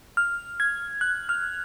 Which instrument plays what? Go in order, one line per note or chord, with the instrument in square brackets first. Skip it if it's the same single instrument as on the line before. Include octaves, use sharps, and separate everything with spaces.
[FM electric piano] F6
G#6
F#6
F6